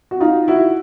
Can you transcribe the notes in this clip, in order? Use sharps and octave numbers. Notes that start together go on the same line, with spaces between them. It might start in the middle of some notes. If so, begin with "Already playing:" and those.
F#4
D#4 F4
E4 F#4